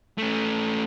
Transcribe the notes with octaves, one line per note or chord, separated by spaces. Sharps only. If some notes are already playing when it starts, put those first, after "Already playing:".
A3 C#4